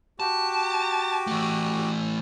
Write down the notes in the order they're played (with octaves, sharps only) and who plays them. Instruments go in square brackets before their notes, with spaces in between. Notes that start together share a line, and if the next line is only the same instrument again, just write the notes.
[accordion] F#4 G4 [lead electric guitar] A5
[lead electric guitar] E3 A3